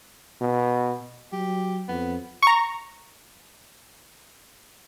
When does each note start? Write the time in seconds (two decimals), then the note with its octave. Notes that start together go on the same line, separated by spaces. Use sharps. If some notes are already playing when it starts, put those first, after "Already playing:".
0.41 B2
1.33 F#3 G4
1.89 F2 B3
2.42 A#5 C#6